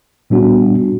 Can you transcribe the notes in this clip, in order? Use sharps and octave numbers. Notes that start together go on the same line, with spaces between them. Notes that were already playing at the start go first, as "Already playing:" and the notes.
A#2 G3 B3 D4 F#4